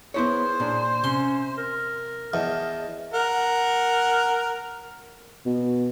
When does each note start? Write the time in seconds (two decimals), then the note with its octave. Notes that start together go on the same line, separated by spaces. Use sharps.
0.14 B3 E4 G#4 C5 C#5
0.60 A#2 D4
1.04 C3 C#4 C6
1.58 A#4
2.34 E2 D#5 A5
3.14 A#4 F#5
5.46 B2